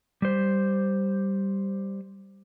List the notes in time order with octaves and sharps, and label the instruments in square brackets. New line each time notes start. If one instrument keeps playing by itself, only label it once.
[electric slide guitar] G3 C5